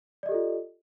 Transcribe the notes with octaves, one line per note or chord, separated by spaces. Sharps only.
F4 G4 A4 D5 D#5